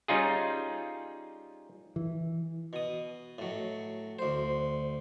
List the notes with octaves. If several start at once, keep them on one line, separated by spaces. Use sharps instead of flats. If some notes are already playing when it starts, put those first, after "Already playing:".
G3 C#4 D#4 F4 G#4
E3
B2 D#6
A2 F#3
D2 C5